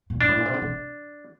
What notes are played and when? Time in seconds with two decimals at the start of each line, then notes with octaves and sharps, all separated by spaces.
0.10 A#2
0.21 G2 D4
0.29 A2
0.38 A#2
0.45 C3
0.54 D3
0.62 C3